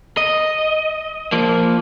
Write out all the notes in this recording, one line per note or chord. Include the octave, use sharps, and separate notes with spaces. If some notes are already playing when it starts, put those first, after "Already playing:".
D#5
F3 A#3